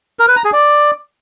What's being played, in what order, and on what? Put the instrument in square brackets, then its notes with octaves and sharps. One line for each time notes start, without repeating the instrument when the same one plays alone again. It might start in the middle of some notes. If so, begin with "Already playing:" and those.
[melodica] A#4
B4
A#5
G#4
D5